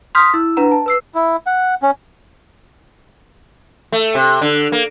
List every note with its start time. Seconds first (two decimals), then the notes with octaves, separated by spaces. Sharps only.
0.15 C6 D#6 F6 G6 B6
0.34 E4 E6
0.57 D4 B4 F#5 A#5
0.71 A5
0.86 B4 E6 C7
1.15 E4
1.46 F#5
1.83 C#4
3.92 A3
4.15 C3
4.41 D3
4.72 A#3